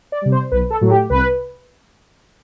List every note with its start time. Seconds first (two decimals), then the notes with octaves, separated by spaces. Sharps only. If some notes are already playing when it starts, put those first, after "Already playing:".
0.12 D5
0.22 C3 G3
0.32 C5
0.52 B1 B4
0.70 A4
0.81 A2 F#3 A3
0.91 G4
1.10 C2 B4